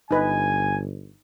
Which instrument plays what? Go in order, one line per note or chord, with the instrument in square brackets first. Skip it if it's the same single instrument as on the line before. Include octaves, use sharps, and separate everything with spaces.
[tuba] G1 [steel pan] D#4 B4 [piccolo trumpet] G#5